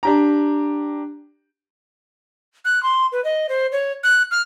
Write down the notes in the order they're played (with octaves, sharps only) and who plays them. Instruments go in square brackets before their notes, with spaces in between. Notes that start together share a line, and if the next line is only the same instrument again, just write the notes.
[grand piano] D4 G4 A#5
[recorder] F#6
C6
B4
D#5
C5
C#5
F#6
F6